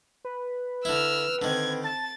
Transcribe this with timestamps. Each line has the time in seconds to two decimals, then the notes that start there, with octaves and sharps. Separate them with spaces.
0.25 B4
0.85 D3 E4 E6 F6
1.42 D3 D#3 C4 G#6
1.84 A5 A6